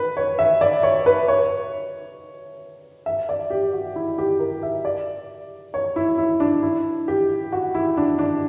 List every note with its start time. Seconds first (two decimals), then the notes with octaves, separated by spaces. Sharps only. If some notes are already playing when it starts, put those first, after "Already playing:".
Already playing: B4
0.17 C#5
0.39 E5
0.61 D5
0.83 C#5
1.06 B4
1.28 C#5
3.06 E5
3.29 D5
3.50 G4
3.73 F#4
3.96 E4
4.18 G4
4.40 A#4
4.63 E5
4.85 D5
5.74 C#5
5.96 E4
6.18 E4
6.40 D4
6.63 E4
7.08 G4
7.52 F#4
7.75 E4
7.97 D4
8.19 D4